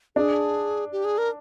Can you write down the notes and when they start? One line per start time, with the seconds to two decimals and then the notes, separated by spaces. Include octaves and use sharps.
0.16 D4 G#4
0.92 G4
1.04 G#4
1.18 A#4